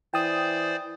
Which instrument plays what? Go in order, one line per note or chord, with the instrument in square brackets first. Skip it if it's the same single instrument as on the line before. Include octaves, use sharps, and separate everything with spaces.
[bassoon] E3 [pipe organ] C5 D5 [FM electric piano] G5 D#6